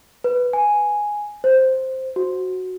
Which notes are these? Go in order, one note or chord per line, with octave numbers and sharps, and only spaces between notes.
B4
G#5
C5
F#4